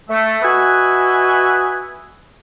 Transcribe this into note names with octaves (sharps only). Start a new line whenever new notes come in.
A3
F#4 B4 D#5 E5 F#5 G#5